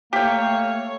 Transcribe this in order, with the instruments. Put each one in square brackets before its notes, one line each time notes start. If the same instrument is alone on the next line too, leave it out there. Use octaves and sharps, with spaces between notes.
[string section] A3 C#5 [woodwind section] A#3 F5 [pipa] G4 G5